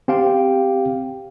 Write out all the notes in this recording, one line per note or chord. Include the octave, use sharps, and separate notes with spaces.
C4 G4 F5 G5